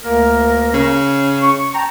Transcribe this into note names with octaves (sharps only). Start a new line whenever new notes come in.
D2 A#3 A#4
C#3
C#6
G5 A5 A#5